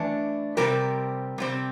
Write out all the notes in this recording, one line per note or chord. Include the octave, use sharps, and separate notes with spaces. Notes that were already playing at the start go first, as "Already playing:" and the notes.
Already playing: E3 A3 D4
C3 G3 C4 G4 A#4
C3 G3 C4